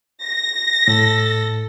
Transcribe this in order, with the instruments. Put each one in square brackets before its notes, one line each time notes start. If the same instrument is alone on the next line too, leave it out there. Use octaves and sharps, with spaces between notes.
[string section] A#6
[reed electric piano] A2 [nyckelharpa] A4